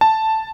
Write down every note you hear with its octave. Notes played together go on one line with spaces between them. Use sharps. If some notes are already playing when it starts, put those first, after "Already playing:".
A5